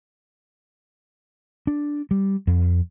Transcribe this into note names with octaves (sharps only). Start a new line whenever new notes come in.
D4
G3
F2